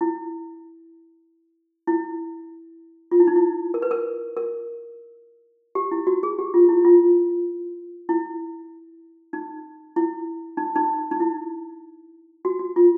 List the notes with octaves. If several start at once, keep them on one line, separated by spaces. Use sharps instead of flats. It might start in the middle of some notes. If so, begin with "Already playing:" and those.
E4
E4
F4
E4
D#4
E4
A#4
B4
A#4
A#4
G4
E4
F#4
G#4
G4
F4
E4
F4
E4
D#4
E4
D#4
D#4
D#4
E4
F#4
F#4
F4